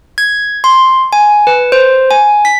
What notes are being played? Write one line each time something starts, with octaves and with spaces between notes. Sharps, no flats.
G#6
C6
G#5
B4
C5
G#5
B6